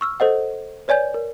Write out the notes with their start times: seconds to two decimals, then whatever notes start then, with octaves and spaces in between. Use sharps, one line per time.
0.01 C#6 E6 F6
0.20 A4 C5 D#5 F#5
0.88 B4 C#5 D5 G#5 G6
1.14 A#4